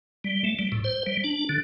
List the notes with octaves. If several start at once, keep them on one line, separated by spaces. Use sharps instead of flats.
G3
A3
G3
A2
C5
G3
D4
D3